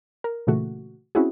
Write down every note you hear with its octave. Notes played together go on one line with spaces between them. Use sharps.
A#4
A#2 C#3 E3 A3 F#4
C4 C#4 E4 F#4 G#4